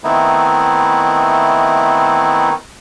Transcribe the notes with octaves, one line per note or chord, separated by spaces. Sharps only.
D#3 A3 B3 C4 D#4 E4